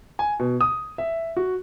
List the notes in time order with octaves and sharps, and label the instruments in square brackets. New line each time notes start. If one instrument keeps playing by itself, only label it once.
[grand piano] G#5
B2
D#6
E5
F#4